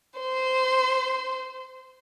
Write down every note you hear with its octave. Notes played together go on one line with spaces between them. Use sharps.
C5